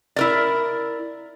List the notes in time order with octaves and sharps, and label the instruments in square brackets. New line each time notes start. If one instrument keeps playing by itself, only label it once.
[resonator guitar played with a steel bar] E4 A#4 D5